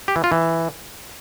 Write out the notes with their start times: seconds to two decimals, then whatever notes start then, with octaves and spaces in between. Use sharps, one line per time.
0.08 G4
0.16 E3
0.24 F4
0.32 E3